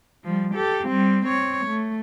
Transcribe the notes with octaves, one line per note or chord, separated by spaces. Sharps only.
F3 G3
G4 A4
G3 C4
C4 C#5
A3